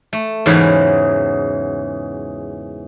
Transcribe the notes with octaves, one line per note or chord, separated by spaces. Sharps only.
A3
E2 G#2 C#3 E3 F#3